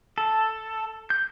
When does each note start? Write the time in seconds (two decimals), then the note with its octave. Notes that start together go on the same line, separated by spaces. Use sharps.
0.18 A4
1.10 G6